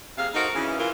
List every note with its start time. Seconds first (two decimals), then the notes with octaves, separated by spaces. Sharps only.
0.18 C3 A#3 G#4 F5
0.34 D#4 F#4 A4 A#4 C5 D#5
0.54 C#3 E3
0.79 E3 F4 A#4